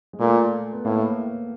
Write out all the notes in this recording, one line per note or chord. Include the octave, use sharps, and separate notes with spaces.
G#3
A#2 A3
B3
A2 A#3